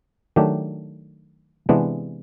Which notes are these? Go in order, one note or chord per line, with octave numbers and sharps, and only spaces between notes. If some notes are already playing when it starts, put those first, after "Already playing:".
D#3 F#3 A3 D4 G4
C3 E3 G#3 B3 D4